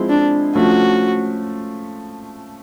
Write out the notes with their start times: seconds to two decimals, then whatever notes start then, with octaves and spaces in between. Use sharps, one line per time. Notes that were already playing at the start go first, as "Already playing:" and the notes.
Already playing: F3 G#3 C4 E4
0.10 D4
0.55 F3 A3 C#4 F#4